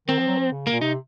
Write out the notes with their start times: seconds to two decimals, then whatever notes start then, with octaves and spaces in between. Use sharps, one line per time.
0.08 D#3 C4
0.19 F3
0.28 F#3
0.38 F3
0.52 C#3
0.67 A#2 A#3
0.81 C3 D#4